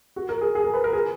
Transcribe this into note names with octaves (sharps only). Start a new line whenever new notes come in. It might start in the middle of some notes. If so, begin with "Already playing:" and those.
F#4
A#4
G#4
G#4
A#4
B4
A#4
G#4